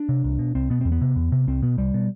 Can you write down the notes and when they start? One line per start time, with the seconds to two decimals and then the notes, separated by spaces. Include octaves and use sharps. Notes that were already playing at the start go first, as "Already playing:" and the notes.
Already playing: D4
0.09 C3
0.24 C2
0.39 B2
0.55 C2 C4
0.70 B2 B3
0.81 E2 C4
0.92 B3
1.01 C3
1.16 E2
1.32 C3
1.47 C2 C4
1.62 B2 B3
1.77 C2 G3
1.94 B2